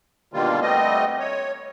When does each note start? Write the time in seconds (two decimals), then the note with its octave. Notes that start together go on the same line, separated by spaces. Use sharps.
0.33 B2 D3 D#3 G3 A#3 F4
0.62 G3 A3 B3 C4 D#5
1.20 C#5